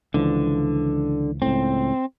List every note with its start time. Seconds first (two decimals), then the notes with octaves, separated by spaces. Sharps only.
0.14 C#2 D3 E3 F3
1.42 C#2 A2 C4